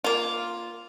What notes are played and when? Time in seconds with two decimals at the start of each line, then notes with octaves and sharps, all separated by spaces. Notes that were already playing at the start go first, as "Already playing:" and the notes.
0.04 A#3 F4